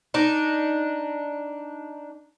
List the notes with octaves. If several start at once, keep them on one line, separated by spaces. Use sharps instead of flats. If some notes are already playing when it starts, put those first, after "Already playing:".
D4 D#4